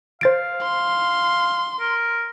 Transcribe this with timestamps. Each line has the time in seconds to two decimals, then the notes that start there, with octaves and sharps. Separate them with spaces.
0.21 C5 F5 A6 D7
0.62 C6
1.80 A#4